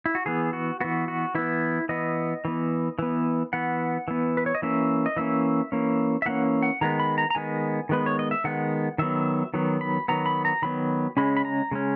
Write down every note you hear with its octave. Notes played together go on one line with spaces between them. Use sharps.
E4
F#4
E3 B3 G#4
F#4
E3 B3 F#4
F#4
E3 B3 E4
E3 B3 D#5
E3 B3
E3 B3
E3 B3 F#5
E3 B3
B4
C#5
D#5
E3 A#3 C#4 E5
D#5
E3 A#3 C#4 E5
E3 A#3 C#4
E5
E3 A#3 C#4 F#5
F#5
D#3 G#3 B3 A#5
B5
A#5
A#5
D#3 G#3 B3 G#5
D#3 G#3 B3 B4
C#5
D#5
E5
D#3 G#3 B3 F#5
D#3 F#3 B3 E5
D#3 F#3 B3
B5
D#3 F#3 B3 A#5
B5
A#5
D#3 F#3 B3 B5
C#3 G#3 C#4 B5
B5
A#5
C#3 G#3 C#4